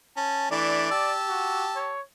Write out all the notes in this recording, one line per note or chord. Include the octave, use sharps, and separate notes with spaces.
C#4 A5
E3 A3 D4 D5
G4 A5 E6
F#4
C#5